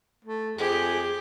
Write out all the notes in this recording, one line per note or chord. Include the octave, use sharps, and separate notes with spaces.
A3
F2 G4 G#4